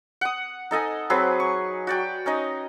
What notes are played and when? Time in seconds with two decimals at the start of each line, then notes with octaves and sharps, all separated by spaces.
0.21 F#5 D#6
0.71 D#4 A4 D#5 G#5
1.10 F#3 C4 G#4 B4
1.40 C#6
1.87 F#4 D5 G5
2.26 C#4 D#4 D#5